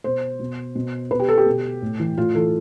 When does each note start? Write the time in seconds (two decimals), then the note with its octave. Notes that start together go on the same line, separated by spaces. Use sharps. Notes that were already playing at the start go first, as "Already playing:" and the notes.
0.04 B2 C5
0.40 B2
0.75 B2
1.11 B2 B4
1.20 G4
1.29 A4
1.38 G4
1.46 B2
1.82 A2
1.99 E3
2.17 A2 F4
2.35 E3 A4